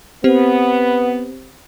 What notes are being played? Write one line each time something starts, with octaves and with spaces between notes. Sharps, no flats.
B3 C4 G4 C5